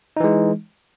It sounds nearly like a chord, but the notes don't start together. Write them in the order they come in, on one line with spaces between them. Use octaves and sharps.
D#4 E3 G#3